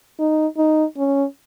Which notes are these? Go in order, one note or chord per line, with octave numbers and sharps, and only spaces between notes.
D#4
D#4
C#4